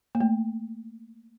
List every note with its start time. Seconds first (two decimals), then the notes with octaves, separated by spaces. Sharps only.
0.15 A#3
0.20 A3